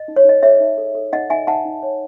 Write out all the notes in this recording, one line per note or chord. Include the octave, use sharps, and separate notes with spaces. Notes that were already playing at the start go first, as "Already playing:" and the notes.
Already playing: D#5
D#4
C#5
D#4 D#5
G#4 C#5 E5
D#4
A4
A4
D#4 D#5 F#5
D#4 E5 G#5
D#4 F#5 A5
D#4
C#5